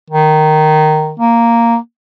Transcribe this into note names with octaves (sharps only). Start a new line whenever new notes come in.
D#3
A#3